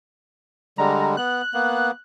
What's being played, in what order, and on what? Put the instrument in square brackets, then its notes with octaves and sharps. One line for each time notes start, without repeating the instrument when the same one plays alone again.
[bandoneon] D3 G3 G#3 [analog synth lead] A#5
[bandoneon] B3 [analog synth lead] F#6
[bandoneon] A#3 B3